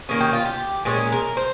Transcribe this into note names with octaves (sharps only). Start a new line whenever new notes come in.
D#3 A#3 C#4 G#4
G4
F4
G4
A#2 G#3 C#4 G#4
A#4
C5